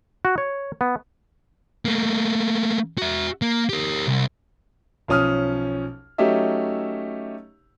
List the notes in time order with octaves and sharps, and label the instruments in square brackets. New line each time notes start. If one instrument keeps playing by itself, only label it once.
[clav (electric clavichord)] F#4
C#5
B3
[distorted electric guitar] A3 A#3
F#4 E5
A#3
G4 A#4
C2
[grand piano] B1 F3 C#4 D#6 F6
F#3 A3 C#4 D#4 G4 E5